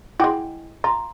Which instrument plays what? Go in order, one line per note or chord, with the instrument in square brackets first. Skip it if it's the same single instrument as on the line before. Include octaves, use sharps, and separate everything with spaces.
[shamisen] G#3 F#4 [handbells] E4 G5 D6
[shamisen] F4 [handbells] A#5